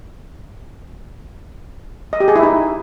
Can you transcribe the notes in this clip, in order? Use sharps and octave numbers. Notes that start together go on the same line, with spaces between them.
D#5
G4
G#4
E4
D#4